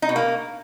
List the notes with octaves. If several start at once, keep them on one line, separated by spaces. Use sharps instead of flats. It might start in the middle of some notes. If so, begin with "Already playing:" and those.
D#4
B2
A#3